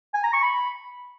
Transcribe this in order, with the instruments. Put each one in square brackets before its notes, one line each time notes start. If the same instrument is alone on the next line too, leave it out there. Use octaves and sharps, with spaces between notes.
[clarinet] G#5
A#5
C#6
B5